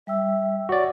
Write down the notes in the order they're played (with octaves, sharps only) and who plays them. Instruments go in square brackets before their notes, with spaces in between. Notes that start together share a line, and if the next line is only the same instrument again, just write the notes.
[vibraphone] G3 G5 E6 [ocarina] E5
[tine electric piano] F#4 D5 [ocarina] C#5